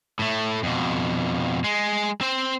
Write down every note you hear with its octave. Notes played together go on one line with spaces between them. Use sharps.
A2 A3
F2 B2
G#3
C4 C5